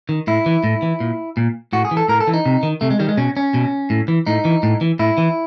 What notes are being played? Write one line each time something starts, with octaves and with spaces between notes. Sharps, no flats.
D#3
A2 E4
E3
A2
E3
A#2
A#2
A2 F#4
G#4
E3
A4
A2 A#4
A4
E3
D#4
C3
D#3
C3 A3
G#3
D#3 G3
G#3
B2 C#4
C#4
B2
A2
E3
A2 D#4
E3
A2
E3
A2 E4
E3